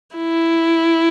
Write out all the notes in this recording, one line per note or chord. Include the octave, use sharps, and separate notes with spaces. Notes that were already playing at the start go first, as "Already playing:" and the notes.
E4